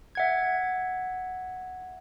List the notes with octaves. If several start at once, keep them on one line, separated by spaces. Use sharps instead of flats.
E5 F#5 G#6